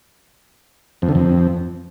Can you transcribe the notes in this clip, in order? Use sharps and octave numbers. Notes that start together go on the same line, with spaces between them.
F2
D3
F2